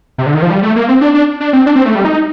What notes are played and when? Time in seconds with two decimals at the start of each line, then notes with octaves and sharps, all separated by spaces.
0.18 C3
0.26 D3
0.34 D#3
0.42 F3
0.50 G3
0.63 A3
0.76 A#3
0.89 C4
1.01 D4
1.14 D4
1.40 D4
1.53 C4
1.66 D4
1.75 C4
1.85 A3
1.95 G3
2.05 D#4